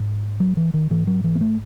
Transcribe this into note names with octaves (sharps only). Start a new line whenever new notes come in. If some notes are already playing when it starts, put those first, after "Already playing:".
Already playing: G#2
F#3
E3
D#3
G#2 E3
F#3
E3
B3
A3